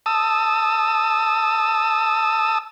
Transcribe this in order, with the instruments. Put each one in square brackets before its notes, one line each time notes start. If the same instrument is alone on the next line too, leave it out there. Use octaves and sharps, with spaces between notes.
[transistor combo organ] A5 D#6 E6